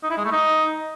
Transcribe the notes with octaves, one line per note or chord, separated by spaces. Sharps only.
D#4
E4
G#3
A3
D#4